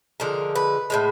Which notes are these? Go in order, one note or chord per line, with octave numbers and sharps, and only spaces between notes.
D3 F3 G#3 A#4
B4
A2 E3 G#3